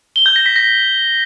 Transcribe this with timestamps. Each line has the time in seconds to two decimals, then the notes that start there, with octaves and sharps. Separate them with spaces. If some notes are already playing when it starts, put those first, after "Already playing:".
0.16 G7
0.26 G6
0.36 A#6
0.46 B6
0.56 A#6